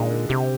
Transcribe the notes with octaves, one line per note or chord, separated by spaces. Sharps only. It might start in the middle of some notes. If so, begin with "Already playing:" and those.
Already playing: A#2 D3 G#3 D#4
D3
C3 G4